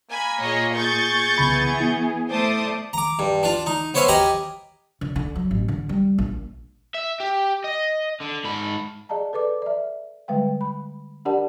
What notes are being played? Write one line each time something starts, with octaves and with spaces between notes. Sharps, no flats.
A#3 G#5 B5
A#2 G#4 C#5 D#5
G#4 C#6 G6 A6
C2 C#3 E3 B3 B5
E4
A3 C5 D5 A5 D#6
A#5 D6
G2
D4 F4
D#4
B3 C5 C#5 E5 F5 G#5
G4 D#5 G#5 A#5 B5
D3
D3
F#3
A1
D3
G3
A#1
E5
G4
D#5
D3
G#2 B5
G#4 D5 D#5 F5 A5 A#5
A4 B4 D5 D6
D5 E5
D3 G3 G#3 B4 F5 G5
B5
D4 G4 A#4 D5 F#5 A5